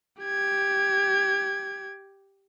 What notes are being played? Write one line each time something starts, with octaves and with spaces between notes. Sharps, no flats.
G4 G#6